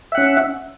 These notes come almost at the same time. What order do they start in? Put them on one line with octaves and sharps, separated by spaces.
E5 F#5 C#4